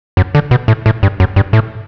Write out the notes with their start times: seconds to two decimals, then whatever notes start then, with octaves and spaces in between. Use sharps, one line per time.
0.17 F#2
0.35 D3
0.51 B2
0.68 A2
0.86 A2
1.03 G2
1.20 F#2
1.36 G2
1.53 A2